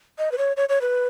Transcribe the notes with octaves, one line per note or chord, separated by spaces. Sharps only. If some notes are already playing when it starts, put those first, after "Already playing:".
D#5
B4
C#5
C#5
C#5
B4